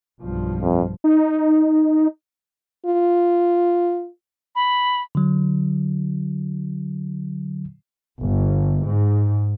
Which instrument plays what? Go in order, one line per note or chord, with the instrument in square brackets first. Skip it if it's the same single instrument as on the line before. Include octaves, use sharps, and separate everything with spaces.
[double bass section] B1 G2 F3
[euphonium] F2
[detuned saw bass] D#4
[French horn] F4
[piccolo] B5
[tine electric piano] D3 F#3
[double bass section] G1
G#2